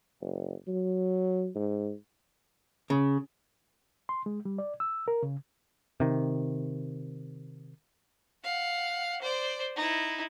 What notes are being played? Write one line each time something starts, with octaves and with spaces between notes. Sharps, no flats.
F#1
F#3
G#2
C#3
C6
G#3
G3
D5
E6
A#4
C#3
C3 D#3
F5 F#5
C5 D5
D#4 E4